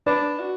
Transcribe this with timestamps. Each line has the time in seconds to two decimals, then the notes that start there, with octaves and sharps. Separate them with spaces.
0.06 D4 B4 D5
0.40 F#4